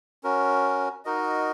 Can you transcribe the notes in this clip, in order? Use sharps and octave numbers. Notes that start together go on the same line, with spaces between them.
C#4 F#4 A#4
D#4 F#4 A#4 D#5